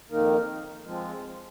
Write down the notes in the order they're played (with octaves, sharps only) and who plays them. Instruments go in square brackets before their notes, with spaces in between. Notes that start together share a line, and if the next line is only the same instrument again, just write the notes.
[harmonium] F2 D#3 A#3 D#4 A#4
F3 G#3 C4 F4